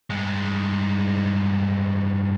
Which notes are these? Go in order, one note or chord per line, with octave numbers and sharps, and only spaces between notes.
G2 G#3